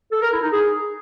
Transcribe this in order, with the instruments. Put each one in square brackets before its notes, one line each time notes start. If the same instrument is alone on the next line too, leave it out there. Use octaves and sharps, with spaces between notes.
[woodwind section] A4
A#4
E4
D#4
G#4